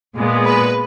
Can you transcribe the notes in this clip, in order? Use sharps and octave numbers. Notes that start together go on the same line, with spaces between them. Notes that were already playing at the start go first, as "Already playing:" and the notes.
A#2 G#3 B3
B4